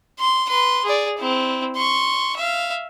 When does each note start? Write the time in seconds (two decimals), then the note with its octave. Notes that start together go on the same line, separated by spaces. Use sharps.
0.19 C6
0.49 B4 C6
0.84 G#4 D5
1.18 C4 E4
1.76 C6 C#6
2.37 E5 F5